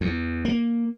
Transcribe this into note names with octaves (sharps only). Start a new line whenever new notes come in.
E2
A#3